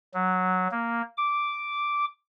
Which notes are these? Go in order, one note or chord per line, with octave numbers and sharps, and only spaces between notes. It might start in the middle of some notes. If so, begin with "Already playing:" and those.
F#3
A#3
D6